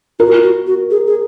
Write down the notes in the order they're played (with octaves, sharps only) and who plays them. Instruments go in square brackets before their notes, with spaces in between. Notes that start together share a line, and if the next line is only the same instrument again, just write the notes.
[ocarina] F4 [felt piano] A#4
[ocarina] F#4
F4
F#4
F#4
G#4
G#4